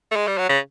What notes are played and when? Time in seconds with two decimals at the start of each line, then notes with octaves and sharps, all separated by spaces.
0.12 A3
0.16 G#3
0.27 G3
0.38 F#3
0.49 C#3